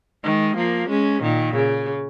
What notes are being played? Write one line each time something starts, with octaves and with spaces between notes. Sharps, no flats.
D#3 G#3
F3 A#3
G#3 C#4
A#2 D#3
C#3